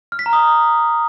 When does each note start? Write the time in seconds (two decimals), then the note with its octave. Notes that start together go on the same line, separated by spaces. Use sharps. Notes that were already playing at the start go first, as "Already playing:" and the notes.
0.12 F6
0.19 B6
0.26 A#5
0.33 D#6